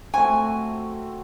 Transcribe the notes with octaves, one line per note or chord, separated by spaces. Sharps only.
A3 C4 F#4 G#5